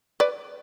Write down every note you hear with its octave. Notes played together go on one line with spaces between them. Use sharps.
B4 D5